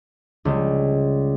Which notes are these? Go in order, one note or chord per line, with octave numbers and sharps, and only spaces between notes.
C#2 G3 G#3